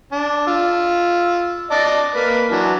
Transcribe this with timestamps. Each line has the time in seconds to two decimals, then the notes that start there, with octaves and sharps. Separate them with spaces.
0.12 D4
0.47 F4 E6
1.71 D5 D#5 A5
2.15 A#3 B4
2.50 E3 F#3 D4